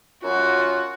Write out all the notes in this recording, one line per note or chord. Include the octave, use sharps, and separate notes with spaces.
F#2 F4 F#4